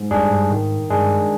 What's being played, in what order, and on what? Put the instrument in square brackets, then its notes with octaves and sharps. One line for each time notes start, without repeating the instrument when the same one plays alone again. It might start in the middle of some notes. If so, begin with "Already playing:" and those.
Already playing: [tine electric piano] G#2
[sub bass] F2 [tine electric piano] G3 D4 G#4
[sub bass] G2
[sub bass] G#2 [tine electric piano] D#3
[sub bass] G2 [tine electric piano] G#3 D4 G#4